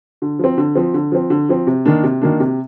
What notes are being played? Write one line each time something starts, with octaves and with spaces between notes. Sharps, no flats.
D3
F3 C4
D3
F3 C4
D3
F3 C4
D3
F3 C4
C3
D#3 A#3 D4
C3
D#3 A#3 D4
C3